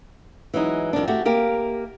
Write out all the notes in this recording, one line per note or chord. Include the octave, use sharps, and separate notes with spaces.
E3 F#3 G#3 D#4
F2 D#3 G3 D4
A3 F#4 G4
A#3 G4 A#4 F5